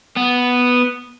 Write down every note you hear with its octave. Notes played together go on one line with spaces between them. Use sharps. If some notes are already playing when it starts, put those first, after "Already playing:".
B3